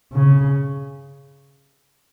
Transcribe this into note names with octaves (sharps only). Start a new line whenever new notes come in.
C#3